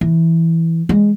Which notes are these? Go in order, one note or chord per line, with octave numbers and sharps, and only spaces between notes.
E3
G#3